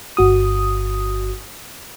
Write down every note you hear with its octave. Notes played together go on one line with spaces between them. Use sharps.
G1 F#4 D#6